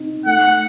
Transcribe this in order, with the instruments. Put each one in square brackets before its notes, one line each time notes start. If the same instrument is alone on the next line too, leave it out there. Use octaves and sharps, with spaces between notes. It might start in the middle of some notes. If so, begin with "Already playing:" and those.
Already playing: [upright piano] C4 D#4
[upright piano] A3 [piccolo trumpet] F#5